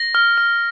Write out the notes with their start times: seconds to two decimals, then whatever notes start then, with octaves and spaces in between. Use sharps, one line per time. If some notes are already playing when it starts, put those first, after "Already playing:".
Already playing: A#6
0.15 F6
0.38 F6